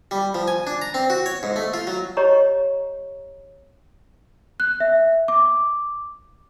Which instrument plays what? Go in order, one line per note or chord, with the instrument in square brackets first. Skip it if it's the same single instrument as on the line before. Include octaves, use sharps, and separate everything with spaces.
[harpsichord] G3
F3
G#5
D4
A#5
C4
F#4
C#5
G#2
A3
F4
F#3
[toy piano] G4 C#5 D#5 A#5 C#6
[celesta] F#6
E5
D6